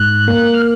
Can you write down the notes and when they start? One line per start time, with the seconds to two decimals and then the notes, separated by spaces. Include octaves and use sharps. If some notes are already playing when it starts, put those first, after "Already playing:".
Already playing: G#2 F#6
0.28 A#3
0.54 F6